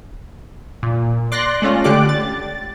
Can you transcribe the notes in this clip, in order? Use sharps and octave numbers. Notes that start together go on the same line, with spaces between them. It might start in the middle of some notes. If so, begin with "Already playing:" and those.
A#2
D5 C6 F#6 A#6
G#3 A3 C#4 F4
D3 A3 G4 D5 D6 F#6
A6